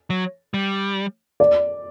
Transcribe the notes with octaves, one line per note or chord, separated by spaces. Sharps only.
F#3
G3
D5